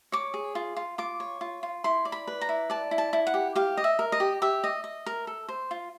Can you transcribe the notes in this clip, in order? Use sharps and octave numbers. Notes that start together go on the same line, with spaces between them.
C#5 D6
G#4
F4
F4
F4 D6
C#5
F4
F4
E4 C6
D5
B5
B4
A#5
E4
D5 A5
E4
A5
E4
F#5
G4
G4 F5
D#5
E5
A#4
D#5
G4
G4 E5
D#5
D#5
A#4
A4
C5
F4